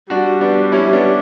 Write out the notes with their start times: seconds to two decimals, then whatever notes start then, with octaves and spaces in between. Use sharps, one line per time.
0.10 G3 D4 F#4
0.41 B3 D4
0.72 C#4 E4
0.93 B3 D4